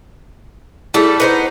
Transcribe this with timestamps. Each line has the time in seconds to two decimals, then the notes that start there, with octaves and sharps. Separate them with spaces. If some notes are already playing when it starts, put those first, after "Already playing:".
0.94 G3 A3 E4 G#4 A4
1.20 B3 D#4 C5